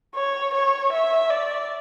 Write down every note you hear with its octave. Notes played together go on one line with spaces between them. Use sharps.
C#5
C#5
E5
D5